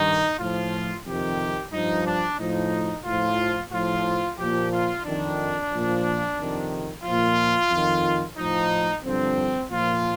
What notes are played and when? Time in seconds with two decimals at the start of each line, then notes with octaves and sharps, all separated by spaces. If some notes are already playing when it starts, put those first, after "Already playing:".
Already playing: G2 D#3 D#4
0.39 A2 F3 F4
1.06 F2 C3 D#3 G4
1.72 G2 F3 D#4
2.06 D4
2.39 A2 F3 D#4
3.05 A2 F3 F4
3.72 A2 F3 F4
4.38 A#2 F3 G4
4.72 F4
5.05 F2 D#3 D4
5.72 A#2 F3
6.38 F2 C3 D#3
7.04 A#2 F3 F4
7.71 F2 D#3
8.37 A2 F3 D#4
9.04 G2 D3 F3 C4
9.70 A#2 F3 F4